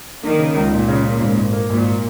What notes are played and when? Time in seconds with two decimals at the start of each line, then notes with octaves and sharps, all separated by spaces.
0.23 D#3 A#3
0.39 C#3
0.55 C#2
0.72 C#2 A#2
0.88 C#3
1.04 C#3
1.20 G#2
1.38 G#1
1.53 A#3
1.70 G#1 A#2